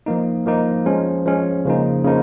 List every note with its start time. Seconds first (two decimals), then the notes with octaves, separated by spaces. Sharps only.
0.06 F3 A#3 D#4
0.46 F3 A#3 D#4
0.86 F3 G#3 C#4
1.26 F3 G#3 C#4
1.65 C#3 F3 A#3 D#4
2.04 C#3 F3 A#3 D#4